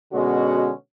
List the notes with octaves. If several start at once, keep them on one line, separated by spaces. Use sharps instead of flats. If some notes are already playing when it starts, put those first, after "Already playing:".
B2 D3 G#3 C#4 F#4